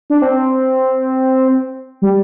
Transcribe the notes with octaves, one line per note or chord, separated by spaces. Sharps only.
D4
C4
G3